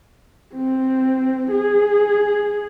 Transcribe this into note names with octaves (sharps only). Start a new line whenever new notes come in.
C4
G#4